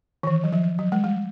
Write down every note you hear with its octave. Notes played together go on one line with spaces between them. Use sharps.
D#3
E3
F#3
F3
F#3
G#3
G3